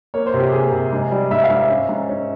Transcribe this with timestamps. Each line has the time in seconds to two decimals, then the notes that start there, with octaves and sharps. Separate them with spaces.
0.14 A#3 C#5
0.26 C5
0.34 C3
0.40 G4
0.52 A#3 G#4
0.72 C3
0.92 G#2
1.12 G3
1.31 G#2 E5
1.44 F5
1.50 G#2
1.56 E5
1.70 C#4
1.89 G#2
2.09 C#4